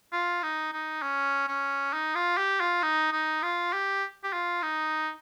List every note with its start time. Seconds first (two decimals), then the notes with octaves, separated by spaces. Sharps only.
0.13 F4
0.43 D#4
0.73 D#4
1.02 C#4
1.48 C#4
1.93 D#4
2.15 F4
2.37 G4
2.60 F4
2.83 D#4
3.12 D#4
3.42 F4
3.73 G4
4.24 G4
4.33 F4
4.63 D#4